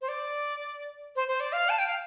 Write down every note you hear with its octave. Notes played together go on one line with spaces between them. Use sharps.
C5
D5
C5
C5
D5
F5
A5
G5
F5